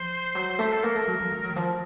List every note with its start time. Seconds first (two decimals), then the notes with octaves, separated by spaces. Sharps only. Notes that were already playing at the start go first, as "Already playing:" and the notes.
Already playing: F3 C5
0.35 F#3
0.59 A3
0.72 A4
0.83 A#3 A#4
0.95 A3
1.07 F#3
1.20 F#3
1.31 A3
1.44 F#3
1.50 D#3
1.56 F3